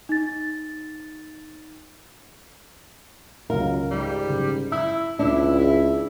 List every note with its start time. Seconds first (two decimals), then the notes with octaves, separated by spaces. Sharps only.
0.09 D#4 A6
3.50 C#2 F#3 A#4 F5
3.91 G#2 G3
4.29 F#1
4.72 E4 E6
5.19 C#2 D4 E4
5.59 E4 G#4